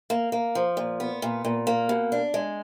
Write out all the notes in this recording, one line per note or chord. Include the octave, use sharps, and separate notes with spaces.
A#3
A#3
F3
A#2
B3
A#2
A#2
A#3
B2
D4
G#3